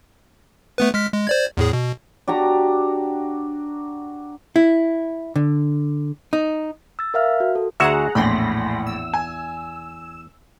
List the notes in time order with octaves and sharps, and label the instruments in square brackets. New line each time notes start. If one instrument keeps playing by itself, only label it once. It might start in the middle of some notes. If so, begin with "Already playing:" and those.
[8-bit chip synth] A3 B3 B4
G#3 F6 B6
G#3
C5 D5 G#6
E2 A2 G#4
B2
[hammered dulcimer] D4 F#4 G4 A#5
[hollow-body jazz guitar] E4
D3
D#4
[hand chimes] E6 A6
A#4 E5 F5 F6
F#4
A4
[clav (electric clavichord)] D2 F#4 E5 [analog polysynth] G#4 F#5 A#5
[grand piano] A#1 A2 [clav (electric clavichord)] E2 [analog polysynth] B5 C6 A#6
[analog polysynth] E6
[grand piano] G#5